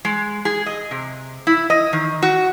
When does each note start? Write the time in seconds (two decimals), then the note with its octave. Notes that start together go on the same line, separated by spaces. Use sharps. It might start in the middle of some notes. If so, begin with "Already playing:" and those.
0.05 G#3
0.45 G#4
0.66 D#5
0.91 C3
1.47 E4
1.70 D#5
1.93 D#3
2.23 F#4